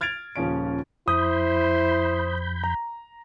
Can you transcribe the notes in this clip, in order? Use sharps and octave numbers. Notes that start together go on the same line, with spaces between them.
F6 G#6 A6 D7 F7
D#1 C#3 F3 C#4 D7
F2 E4 C5 B5 D#6 G6
A#5